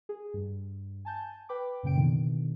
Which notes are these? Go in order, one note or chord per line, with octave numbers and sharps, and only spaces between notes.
G#4
G2
G#5 A5 G6
B4 G5 B5 D6
F#2 A#2 C#3 G5 D7
B2 D3 D#3